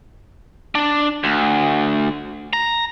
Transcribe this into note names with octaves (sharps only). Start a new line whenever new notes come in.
D4
D2
A#5